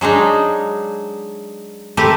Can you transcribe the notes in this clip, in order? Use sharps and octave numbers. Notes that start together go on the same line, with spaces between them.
F#3 G#3 D4 D#4
A3 C4 G4 A#4 B4